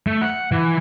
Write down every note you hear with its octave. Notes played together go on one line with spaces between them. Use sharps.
A3
F#5
E3